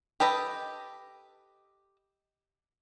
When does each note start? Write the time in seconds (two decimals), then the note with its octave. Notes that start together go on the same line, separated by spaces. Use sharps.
0.20 G4 A4 B4 D#5